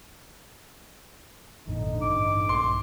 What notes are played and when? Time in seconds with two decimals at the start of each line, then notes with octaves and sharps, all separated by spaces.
1.67 G#1 F2 A#2 D3 D#4
2.02 A1 G2 C#4 D6
2.49 A#1 G2 A#2 C6